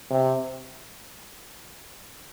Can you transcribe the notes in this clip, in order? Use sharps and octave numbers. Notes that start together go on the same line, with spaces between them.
C3